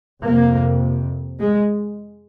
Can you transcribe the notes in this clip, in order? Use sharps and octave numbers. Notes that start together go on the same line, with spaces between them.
F2 C3 A#3
G#3